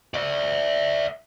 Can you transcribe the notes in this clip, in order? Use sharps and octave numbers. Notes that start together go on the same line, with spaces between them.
D5 E5